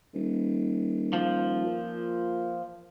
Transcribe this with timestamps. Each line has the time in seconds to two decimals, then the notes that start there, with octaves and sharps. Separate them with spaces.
0.14 D#1
1.13 F3
1.64 A#2